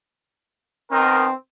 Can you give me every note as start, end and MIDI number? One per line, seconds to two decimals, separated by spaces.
0.92 1.26 47
0.92 1.26 51
0.92 1.33 60
0.92 1.26 70